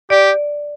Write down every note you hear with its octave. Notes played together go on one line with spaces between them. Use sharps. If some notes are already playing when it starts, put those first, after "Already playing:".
G4 D5